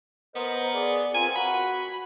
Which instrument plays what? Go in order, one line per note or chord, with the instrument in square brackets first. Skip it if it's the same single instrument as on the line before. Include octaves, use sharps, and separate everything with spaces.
[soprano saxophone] B3 [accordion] A#4 C5 D#5
[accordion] G#4 D5
[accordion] C4 F4 A#4 [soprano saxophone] G#5
[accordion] F#4 F#5 [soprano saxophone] B5